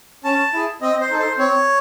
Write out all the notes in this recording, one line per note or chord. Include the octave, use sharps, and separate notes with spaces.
C#4 A5
E4 G#4
C4 D#5
C5
D#4 A4
C5
C4 C#5